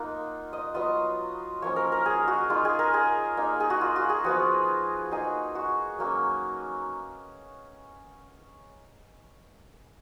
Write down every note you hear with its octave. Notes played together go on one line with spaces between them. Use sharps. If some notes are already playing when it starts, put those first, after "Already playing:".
Already playing: A#3 D#4 F4 F#5
D#5
F#3 B3 F4 D#5
F3 A#3 C#4 C#5
A#4
A#4
G#4
F#4
G#3 D#4 F4
G#4
A#4
G#4
A#3 D#4
G#4
F#4
F4
F#4
G#4
F3 B3 F4 F#4
A#3 D#4 G#4
F#4
F#3 A#3 C#4